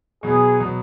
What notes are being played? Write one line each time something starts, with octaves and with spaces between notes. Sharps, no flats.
B2 F#3 B3 G#4
B2 F#3 B3